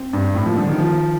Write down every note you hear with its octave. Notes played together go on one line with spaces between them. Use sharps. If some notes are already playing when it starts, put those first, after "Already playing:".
Already playing: C4
G2
A2 C4
F3 A#3
D3 G3
D#3 F3
D#3 F3